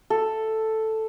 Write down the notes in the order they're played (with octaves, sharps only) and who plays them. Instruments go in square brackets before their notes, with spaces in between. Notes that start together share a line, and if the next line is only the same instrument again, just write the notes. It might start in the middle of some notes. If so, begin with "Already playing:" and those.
[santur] A4